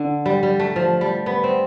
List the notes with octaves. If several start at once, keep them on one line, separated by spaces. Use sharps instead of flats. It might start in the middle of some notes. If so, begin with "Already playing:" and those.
Already playing: D3 A3
G3
G3
A3
F3
G3
B3
C4